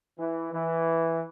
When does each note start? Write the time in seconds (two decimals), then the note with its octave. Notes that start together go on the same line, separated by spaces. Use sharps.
0.19 E3
0.53 E3